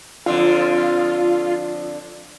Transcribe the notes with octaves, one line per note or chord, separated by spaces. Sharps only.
F2 D3 F4